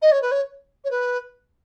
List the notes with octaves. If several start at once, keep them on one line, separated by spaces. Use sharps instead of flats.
D#5
C#5
B4
C#5
C#5
B4